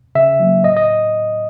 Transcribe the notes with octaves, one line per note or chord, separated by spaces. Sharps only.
C#3 E5
F#3 A#3
A2 D#5
D#5